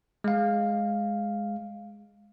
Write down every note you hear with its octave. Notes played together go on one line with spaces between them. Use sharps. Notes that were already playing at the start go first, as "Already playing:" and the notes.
G#3 F5